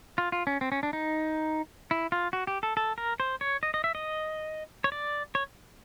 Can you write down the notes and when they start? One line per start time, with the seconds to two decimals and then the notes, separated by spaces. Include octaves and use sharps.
0.18 F4
0.32 F4
0.47 C#4
0.61 C4
0.72 C#4
0.83 D4
0.93 D#4
1.91 E4
2.12 F4
2.33 F#4
2.47 G4
2.63 A4
2.77 A4
2.98 A#4
3.20 C5
3.41 C#5
3.63 D#5
3.74 D#5
3.84 E5
3.95 D#5
4.84 C#5
4.92 D5
5.35 C#5